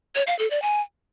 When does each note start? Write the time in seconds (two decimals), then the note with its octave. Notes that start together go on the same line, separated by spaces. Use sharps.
0.15 C#5
0.27 F5
0.39 A4
0.50 D5
0.62 G#5